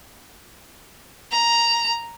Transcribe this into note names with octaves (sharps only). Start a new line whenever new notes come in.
A#5